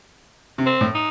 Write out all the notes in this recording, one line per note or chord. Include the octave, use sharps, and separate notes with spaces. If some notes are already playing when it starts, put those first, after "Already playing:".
C3
C4
A2
D#4